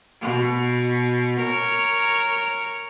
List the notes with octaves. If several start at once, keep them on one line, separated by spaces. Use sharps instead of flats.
B2
A#4 C#5